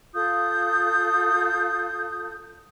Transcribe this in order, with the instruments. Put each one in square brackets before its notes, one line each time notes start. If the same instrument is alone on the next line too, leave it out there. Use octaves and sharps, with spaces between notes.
[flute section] F4 A4 D#6 G6